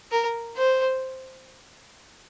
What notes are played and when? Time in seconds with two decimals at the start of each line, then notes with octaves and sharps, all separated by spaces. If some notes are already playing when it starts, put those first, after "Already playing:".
0.12 A#4
0.56 C5